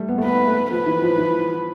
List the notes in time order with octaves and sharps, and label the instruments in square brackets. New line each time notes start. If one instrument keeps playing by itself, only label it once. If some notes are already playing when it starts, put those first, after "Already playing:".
Already playing: [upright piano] G3 A3
B3
A3
[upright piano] B3 [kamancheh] B4
[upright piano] A3
[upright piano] F3 [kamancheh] B4
[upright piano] E3
F3
E3